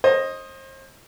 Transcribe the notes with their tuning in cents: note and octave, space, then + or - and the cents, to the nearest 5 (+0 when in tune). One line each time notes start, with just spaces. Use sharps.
C5 +35 D#5 +0